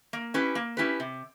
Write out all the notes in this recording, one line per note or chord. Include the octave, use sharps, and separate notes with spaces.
A#3
C#4 E4 G4 B4
A#3
C#4 E4 G4 B4
C3